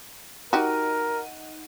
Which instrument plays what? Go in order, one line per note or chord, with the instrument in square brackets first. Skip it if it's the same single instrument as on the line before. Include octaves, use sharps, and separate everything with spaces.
[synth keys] D#4 F#5 D#7 [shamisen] F#4 G4 [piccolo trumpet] A#4